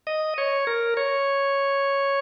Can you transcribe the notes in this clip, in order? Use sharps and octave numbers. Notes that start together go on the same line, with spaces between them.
D#5
C#5
A#4
C#5